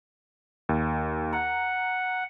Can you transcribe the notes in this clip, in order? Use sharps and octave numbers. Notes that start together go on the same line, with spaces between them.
D#2
F#5 A#5